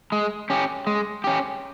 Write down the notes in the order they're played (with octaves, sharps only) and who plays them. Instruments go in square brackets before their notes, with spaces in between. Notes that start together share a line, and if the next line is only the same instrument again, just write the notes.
[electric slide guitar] G#3
C#4 G4
G#3
C#4 G4